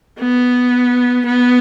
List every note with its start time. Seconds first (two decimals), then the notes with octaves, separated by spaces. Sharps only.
0.19 B3
1.25 B3